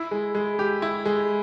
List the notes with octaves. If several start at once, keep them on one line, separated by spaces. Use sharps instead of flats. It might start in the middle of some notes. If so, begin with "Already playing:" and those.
Already playing: E4
G#3
G#3
G4
E4
G#3